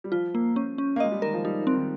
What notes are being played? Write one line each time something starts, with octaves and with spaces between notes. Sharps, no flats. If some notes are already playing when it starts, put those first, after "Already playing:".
G3
F3 F4
A#3
C#4
C#4
A#3
G#3 D#5
G3
D#3 A#4
F3
G3 D#4
F3 C4
D#3